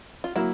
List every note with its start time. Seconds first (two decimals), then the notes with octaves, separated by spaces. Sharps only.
0.24 F4
0.36 F#3 A#3 E4